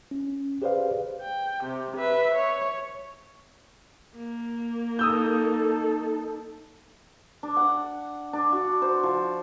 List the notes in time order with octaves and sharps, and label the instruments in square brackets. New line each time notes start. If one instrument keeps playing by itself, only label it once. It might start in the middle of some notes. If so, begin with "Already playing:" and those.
[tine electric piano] C#4
G4 G#4 B4 C5 D5 F5
[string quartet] G5
C3
B4 E5
C#5
[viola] A#3
[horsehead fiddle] D#4 A4 [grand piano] D#6 E6 G6
[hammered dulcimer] D4
F#5
D4
F#4
C5
F3